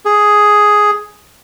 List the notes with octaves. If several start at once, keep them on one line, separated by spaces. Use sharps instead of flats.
G#4